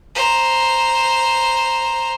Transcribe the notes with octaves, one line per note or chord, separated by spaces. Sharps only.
C5 A#5